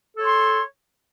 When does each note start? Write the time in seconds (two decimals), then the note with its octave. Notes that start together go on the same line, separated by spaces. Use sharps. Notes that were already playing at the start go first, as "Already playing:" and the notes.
0.16 A4
0.20 C#5
0.25 C6